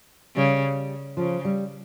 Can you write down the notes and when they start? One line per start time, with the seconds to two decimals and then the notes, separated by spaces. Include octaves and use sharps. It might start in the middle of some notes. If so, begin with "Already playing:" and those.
0.36 C#3 G3
1.17 C#3 F3
1.45 G3